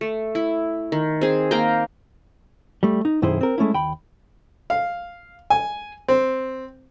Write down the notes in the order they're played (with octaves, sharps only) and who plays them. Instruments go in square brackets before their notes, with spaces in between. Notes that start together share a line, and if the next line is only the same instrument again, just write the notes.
[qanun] A3
E4
D#3
C4 G#4
A#3 F5 G5 A#5
[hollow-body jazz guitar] G3 A3
D#4
B1 F#2 D#3 E4 G#4 C5
C4 A#4
G#3 A3 C#4 E4
D#2 G5 B5
[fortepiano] F5
G#5
C4